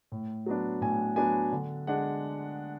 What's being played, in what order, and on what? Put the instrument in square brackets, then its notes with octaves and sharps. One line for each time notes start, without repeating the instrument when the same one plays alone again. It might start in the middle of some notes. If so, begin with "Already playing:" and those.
[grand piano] A2
F#3 B3 D4
A2 G#5
F#3 B3 D4 G#5
D3
G#3 D4 F#5